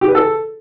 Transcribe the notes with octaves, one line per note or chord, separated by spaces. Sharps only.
G4
B4
A4